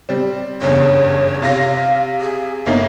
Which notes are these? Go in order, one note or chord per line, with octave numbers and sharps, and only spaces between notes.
G3 C4
F#1 E2 G2 C#5
C3 F5 A#6
G#4
G1 A#3 D#4 E5